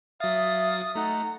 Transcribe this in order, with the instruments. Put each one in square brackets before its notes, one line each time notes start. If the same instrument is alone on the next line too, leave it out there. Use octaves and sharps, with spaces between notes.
[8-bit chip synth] F#3 F5 [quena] E5 [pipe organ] D#6 A6
[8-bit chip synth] A3 D#4 F#5 [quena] A#5